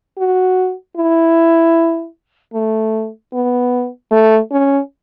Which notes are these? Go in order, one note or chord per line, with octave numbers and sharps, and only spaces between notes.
F#4
E4
A3
B3
A3
C#4